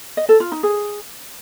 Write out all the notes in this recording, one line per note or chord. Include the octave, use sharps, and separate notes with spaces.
D#5
A4
F4
D#4
G#4